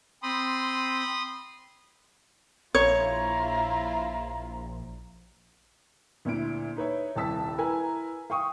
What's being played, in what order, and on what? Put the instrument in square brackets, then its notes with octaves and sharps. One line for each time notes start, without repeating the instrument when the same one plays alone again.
[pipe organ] C4 [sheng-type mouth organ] B5 C6 D#6
[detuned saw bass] A#1 [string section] E4 F4 [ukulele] C#5 [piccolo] A#5
[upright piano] D2 A#2 E4 D7
D#4 B4 C#5 E5
D#1 C2 E4 A5 E6 B6
E4 A#4 B4 G#5 A#5
F5 G5 C#6 D#6